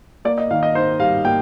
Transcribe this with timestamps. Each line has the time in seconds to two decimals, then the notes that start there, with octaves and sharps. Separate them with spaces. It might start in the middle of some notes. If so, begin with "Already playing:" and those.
0.25 A#3 D5
0.38 D#5
0.51 D#3 F5
0.63 D#5
0.75 D#4 C5
1.00 G3 F5
1.25 A#3 G5